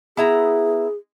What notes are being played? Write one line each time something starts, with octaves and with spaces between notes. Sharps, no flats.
B3 E4 G#4 A#5